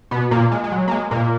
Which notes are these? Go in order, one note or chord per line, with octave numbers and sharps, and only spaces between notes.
B2 B3
A#2 A#3
G#3
G#3
F#3
A#3
G#3
A#2 A#3